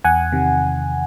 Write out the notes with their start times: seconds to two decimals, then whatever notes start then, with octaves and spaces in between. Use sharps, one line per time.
0.04 E2 F#5 G#5
0.33 C3 D#3